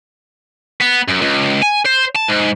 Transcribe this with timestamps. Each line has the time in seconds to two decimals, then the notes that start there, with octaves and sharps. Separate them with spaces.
0.81 B3
1.08 F#2
1.21 C#2
1.62 G#5
1.85 C5
2.15 A5
2.28 G#2